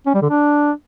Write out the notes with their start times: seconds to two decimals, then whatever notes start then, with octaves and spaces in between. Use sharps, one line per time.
0.06 C#4
0.14 G3
0.22 D3
0.30 D4